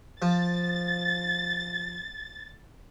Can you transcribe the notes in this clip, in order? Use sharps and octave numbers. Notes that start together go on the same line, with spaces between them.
F3 A6